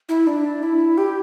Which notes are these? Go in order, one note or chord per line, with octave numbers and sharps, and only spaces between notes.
E4
D4
E4
G4